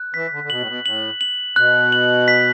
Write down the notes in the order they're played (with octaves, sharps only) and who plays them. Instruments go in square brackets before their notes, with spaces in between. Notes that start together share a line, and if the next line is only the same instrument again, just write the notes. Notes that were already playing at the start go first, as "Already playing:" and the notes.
Already playing: [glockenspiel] F#6
[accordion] E3 [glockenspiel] B6
[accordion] D3
D3
[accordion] B2 [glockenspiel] F#7
[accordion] A2
B2
[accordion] A2 [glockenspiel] F#7
[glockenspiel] F#7
[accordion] B2 [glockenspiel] F#6
[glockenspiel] F#7
B6